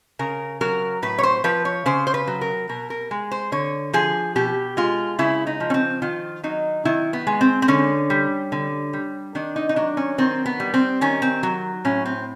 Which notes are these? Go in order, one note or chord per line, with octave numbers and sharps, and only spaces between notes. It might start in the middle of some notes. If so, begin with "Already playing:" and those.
C#3 A#4
F#3 A#4
A2 B4
C#5
C5
F3 B4
C#5
C#3 C5
C5
B4
F#3
A#4
B2 A#4
A#4
G#3
C5
D3 C#5
F3 G#4
B2 G4
G#3 F4
C#3 E4
D#4
F3
C#4
C4
D#3 F4
F#3 D#4
D#3 E4
B3
G#3
C4
C4
D3 C#4
G3
D3
G3
D#3 D4
D#4
D#4
F#3 D4
C#4
D#3 C4
B3
G3
C4
D#3 C#4
C4
F#3
A2 C#4
C4